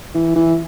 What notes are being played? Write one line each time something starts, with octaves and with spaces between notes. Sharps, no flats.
E3
E3